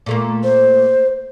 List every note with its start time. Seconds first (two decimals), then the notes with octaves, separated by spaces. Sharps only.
0.06 A#2 A3 A#3
0.44 C5